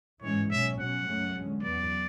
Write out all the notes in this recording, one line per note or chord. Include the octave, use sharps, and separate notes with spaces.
G#2 E3 G#3 C#4 C#5
B2 F#3 C#4 E5
B2 F#3 C#4 F#5
F#2 C#3 F#3 A3 C#4
E2 D3 G#3 C#4
E2 C#3 F#3 B3 D5